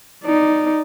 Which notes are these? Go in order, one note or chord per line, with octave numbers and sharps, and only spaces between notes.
D#4 D5